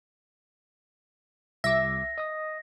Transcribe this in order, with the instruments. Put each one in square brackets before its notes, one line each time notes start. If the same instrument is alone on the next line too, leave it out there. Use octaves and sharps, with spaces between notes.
[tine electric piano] C2 D6 [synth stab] E5 [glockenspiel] A#6
[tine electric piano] D#5 D#6